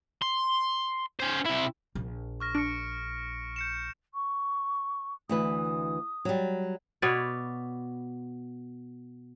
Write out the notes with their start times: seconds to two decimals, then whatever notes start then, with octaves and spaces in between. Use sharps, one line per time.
0.22 C6
1.20 C#4 C5
1.45 C3 E4
1.95 A#1
2.40 C#6 F6 A#6
2.55 D4 C#7 D7
3.56 G6 C#7 E7
4.14 C#6
5.29 D2 E3 B4 D#6
6.25 F#3 G3
7.02 B2 B4 C#5 D5